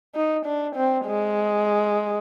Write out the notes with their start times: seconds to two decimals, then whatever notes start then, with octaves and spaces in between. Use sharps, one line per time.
0.15 D#4
0.46 D4
0.76 C4
1.06 G#3